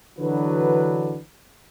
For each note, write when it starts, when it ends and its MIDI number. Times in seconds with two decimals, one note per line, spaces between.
0.18 1.18 50
0.18 1.18 52
0.18 1.18 54
0.18 1.18 62
0.18 1.18 66
0.18 1.18 71